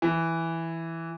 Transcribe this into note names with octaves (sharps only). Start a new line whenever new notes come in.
E3